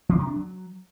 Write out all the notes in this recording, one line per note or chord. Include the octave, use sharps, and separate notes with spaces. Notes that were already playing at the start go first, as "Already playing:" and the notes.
E3
C3
D4
F#3